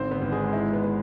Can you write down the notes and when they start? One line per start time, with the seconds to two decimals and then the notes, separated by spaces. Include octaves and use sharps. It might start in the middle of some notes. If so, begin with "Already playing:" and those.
Already playing: G#1 D3 C4 C5
0.11 B3 B4
0.22 G#1
0.32 G#3 G#4
0.53 G#3 E4
0.73 B3 B4
0.84 B3